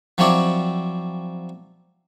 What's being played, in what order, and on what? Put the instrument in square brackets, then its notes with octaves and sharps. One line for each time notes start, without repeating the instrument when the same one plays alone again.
[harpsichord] F3 F#3 C4 E4 C#5 D5